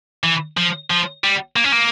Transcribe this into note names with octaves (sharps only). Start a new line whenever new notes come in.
E3
F3
F3
G3
A#3
C#4
A#3